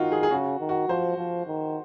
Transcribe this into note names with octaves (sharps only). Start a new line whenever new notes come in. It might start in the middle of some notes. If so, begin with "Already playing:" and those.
Already playing: D#3 D#4 F4 F#4
G#4
G#4
C#3 F#4
D#3
F#4
F3 C5
F3
D#3